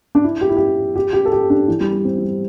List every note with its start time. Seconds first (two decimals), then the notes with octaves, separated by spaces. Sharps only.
0.15 D4
0.24 E4
0.41 G4
0.49 E4
0.57 G4
0.96 G4
1.13 G4
1.25 A4
1.32 G4
1.50 D4
1.68 E3
1.80 G3
1.92 G3
2.04 C4
2.18 E3
2.22 G3